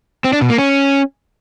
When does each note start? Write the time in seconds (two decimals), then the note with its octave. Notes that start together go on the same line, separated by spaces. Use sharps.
0.24 C4
0.33 D4
0.41 B2
0.50 A#3
0.58 C#4